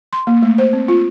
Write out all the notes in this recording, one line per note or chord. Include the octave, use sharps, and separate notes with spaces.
C6
A#3
A3
C5
C4
F4